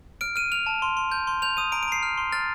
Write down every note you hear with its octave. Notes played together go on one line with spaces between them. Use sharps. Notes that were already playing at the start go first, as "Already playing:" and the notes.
F6 D7
F6 D#7
F6 F7
A5
C6
C6
G6
C6
G6 F7
D#6 D#7
A#5 D7
D7
A#5 C7
F6
C6
F6 A6